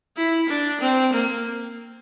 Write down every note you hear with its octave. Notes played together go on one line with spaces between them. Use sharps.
E4
D4
C4
A#3